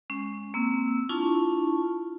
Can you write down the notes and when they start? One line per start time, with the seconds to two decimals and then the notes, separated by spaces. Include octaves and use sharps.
0.10 G#3 C#4
0.54 A#3 C4 E6
1.09 D4 E4 F4 A5 C#6